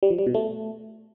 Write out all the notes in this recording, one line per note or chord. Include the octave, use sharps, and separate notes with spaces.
G3
F3
G3
B2
A3